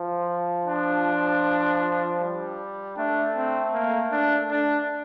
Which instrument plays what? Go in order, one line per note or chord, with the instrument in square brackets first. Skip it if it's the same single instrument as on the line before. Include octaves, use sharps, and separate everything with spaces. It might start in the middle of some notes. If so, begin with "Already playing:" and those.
Already playing: [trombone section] F3
[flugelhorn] D4
[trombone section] G3
[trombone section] A3 [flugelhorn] D4
[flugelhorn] C4
A#3
D4
D4